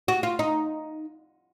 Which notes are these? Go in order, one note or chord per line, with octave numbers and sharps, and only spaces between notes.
F#4
F4
D#4